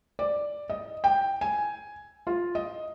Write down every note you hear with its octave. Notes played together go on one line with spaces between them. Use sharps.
D5
D#5
G5
G#5
F4
D#5